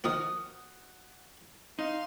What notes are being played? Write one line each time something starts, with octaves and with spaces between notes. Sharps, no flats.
D#3 F3 A#3 F#4 D#6 F6
D#4 F5 C6